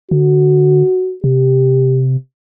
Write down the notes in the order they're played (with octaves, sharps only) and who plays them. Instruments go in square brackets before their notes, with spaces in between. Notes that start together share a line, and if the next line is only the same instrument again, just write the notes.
[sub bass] D3 [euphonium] F#4
[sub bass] C3 [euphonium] G4